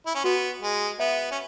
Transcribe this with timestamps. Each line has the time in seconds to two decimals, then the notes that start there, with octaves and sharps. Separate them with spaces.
0.06 E4
0.15 C#4
0.24 B3 F#4
0.62 G#3
1.00 B3 E5
1.31 C#4